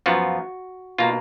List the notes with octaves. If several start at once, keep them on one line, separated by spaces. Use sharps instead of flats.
F#2 F3 B3 F4 F#4
B2 A#3 F4